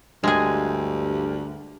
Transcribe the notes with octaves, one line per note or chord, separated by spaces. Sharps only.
D2 G2 G#3 G4 G#4